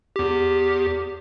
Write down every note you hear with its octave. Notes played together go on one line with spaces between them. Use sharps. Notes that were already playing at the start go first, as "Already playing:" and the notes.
E2 G4